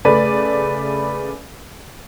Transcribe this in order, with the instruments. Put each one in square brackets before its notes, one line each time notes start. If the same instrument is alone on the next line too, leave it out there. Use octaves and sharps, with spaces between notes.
[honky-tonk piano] C#3 A3 B4 D5